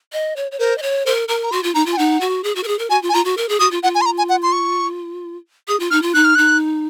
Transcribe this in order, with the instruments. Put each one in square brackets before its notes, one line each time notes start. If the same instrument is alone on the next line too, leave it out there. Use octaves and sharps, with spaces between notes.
[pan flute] D#5
C#5
C#5
[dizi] A#4 [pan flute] C5
[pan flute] D#5
C#5
[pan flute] A#4 [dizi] C5
[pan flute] A#4 [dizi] A#5
[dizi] A#5
[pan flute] F#4 [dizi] C6
[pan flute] F4
[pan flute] D#4 [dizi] A#5
[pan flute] F4
[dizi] G#5
[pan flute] D#4 [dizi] F#5
[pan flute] F#4
G#4
F#4
A#4
G#4
A#4
[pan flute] F#4 [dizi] G#5
[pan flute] F4
[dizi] G#5
[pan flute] F4 [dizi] A#5
[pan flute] F#4
A#4
G#4
[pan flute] F#4 [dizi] D#6
[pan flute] F4
[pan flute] F4 [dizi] F#5
[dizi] G#5
C6
A#5
G#5
F#5
C6
C#6
[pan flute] G#4 [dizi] D#6
[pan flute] F4
[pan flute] D#4 [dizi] F6
[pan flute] F4
[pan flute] D#4 [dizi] F#6
[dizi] F6
[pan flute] D#4 [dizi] F#6